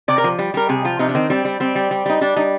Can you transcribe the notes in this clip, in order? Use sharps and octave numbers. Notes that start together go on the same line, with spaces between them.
C3 D5
A#4
F3
G3
G3 A#4
C3 G#4
F3 F4
C3 D#4
D4
D#3 C4
G3 C4
G3
G3 C4
G3
G3
G3 D#4
G3 D4
G3 D#4